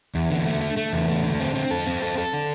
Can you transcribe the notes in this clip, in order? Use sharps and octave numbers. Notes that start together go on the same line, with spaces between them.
E2
D3
A3
A3
A3
E2
A3
D3
C4
C4
A4
C4
A4
A4
D3